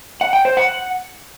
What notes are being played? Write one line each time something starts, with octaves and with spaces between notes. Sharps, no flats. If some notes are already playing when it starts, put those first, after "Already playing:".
F#5
G5
C5
F#5